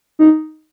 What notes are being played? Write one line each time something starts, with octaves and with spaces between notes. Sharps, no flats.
D#4